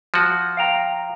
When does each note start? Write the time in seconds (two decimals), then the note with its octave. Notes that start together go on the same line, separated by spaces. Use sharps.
0.14 F3 F#4
0.57 F5 G5 A#5